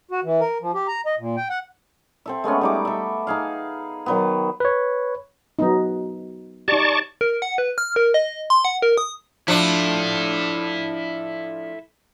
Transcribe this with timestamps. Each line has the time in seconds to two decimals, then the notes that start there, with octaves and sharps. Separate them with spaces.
0.11 F#4
0.24 E3
0.41 A#4
0.61 F3
0.74 G4
0.88 A#5
1.06 D#5
1.18 A#2
1.36 G5
1.50 F#5
2.26 C4 A4 E5
2.44 G#3 A3 B3 C#4
2.61 G3 D#4 D6
2.85 A4 E5
3.27 D#4 G#4 F5
4.06 D#3 F#3 B3
4.60 B4 C#5
5.59 F#3 B3 D#4
6.68 D#4 G4 D5 A5 C#6
7.21 A#4
7.42 F#5
7.58 B4
7.78 F6
7.96 A#4
8.14 D#5
8.50 C6
8.65 F#5
8.82 A#4
8.98 D#6
9.48 F3 D4 E4 A4